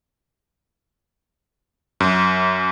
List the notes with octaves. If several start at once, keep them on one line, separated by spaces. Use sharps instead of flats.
F#2